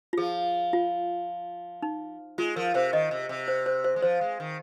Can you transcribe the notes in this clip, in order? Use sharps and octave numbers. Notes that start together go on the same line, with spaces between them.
F4
F3 G#4
F4
D#4
G#3 F4
F3 A#4
C3 C5
D#3 D#5
C3
C3
C5
C5
C5
G#3
F3 C5
G#3
D#3